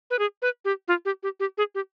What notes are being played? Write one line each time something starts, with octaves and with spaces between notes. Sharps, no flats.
B4
G#4
B4
G4
F4
G4
G4
G4
G#4
G4